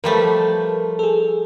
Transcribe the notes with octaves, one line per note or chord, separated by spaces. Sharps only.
F3 G3 A3 A#4 B4
G#4 A4